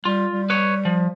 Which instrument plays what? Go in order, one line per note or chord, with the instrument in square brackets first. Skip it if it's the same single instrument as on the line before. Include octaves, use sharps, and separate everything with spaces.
[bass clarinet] G3 [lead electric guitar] F4
[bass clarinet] G3
[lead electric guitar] B4 C#5
F3